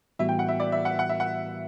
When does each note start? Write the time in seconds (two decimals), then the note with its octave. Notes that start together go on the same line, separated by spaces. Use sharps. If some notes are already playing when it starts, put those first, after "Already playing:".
0.19 A2 E3 G3 B3 F#4 E5
0.29 G5
0.39 F#5
0.49 E5
0.60 D5
0.72 E5
0.85 F#5
0.99 F#5
1.09 E5
1.20 F#5